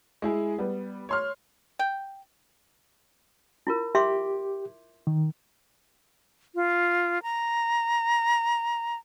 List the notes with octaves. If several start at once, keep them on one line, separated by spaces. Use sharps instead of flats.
G#3 E4 G#4
G3 B3
C#5 C6 F6
G5
E4 F4 A#4
G4 E5 C6 D6
D#3
F4
A#5